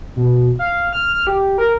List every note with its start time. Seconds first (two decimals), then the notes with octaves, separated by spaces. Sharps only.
0.16 B2
0.59 F5
0.93 F6
1.14 F6
1.27 G4
1.58 A#4